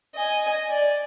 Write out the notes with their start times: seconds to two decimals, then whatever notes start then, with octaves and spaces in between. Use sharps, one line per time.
0.15 D#5 G#5
0.67 D5 G#5